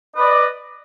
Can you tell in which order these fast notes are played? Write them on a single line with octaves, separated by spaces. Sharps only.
D#5 B4 D5